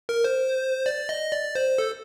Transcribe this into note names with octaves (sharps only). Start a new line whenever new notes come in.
A#4
C5
D5
D#5
D5
C5
A4